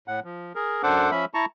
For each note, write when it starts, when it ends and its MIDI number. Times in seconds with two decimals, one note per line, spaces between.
0.08 0.20 45
0.08 0.20 78
0.24 0.53 53
0.55 0.82 68
0.55 0.82 70
0.83 1.11 42
0.83 1.11 62
0.83 1.11 69
0.83 1.11 72
0.83 1.11 78
0.83 1.11 86
1.11 1.25 53
1.11 1.25 61
1.11 1.25 76
1.11 1.25 83
1.11 1.25 88
1.34 1.45 64
1.34 1.45 81
1.34 1.45 82
1.34 1.45 85